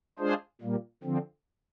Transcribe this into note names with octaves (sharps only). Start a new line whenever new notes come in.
G#3 D4 F4 G#4 C5
A#2 G3 A#3
D3 F3 C4